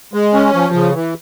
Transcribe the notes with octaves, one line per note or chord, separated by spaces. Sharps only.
G#3
C#4
F3
C#3
E3